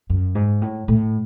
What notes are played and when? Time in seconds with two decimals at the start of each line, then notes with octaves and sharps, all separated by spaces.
0.10 F#2
0.35 G#2
0.62 A2
0.88 A2